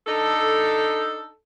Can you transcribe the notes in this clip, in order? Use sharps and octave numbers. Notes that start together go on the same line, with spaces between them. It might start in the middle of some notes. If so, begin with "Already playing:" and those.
D4 D#4 A4